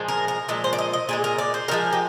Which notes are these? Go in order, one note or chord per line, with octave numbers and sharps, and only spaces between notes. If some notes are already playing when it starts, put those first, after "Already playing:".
Already playing: A#2 F3 G#3
A#4
A#4
A#2 F3 G#3
C5
D5
D#5
D#5
A#2 F3 G#3 G#4
A#4
D5
C5
A#2 F3 G#3 A#4
G4